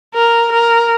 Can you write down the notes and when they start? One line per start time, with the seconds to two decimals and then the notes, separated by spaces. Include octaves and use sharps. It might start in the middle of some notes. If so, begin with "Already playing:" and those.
0.15 A#4
0.52 A#4